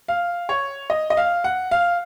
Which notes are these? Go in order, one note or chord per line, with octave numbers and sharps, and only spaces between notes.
F5
C#5
D#5
D#5
F5
F#5
F5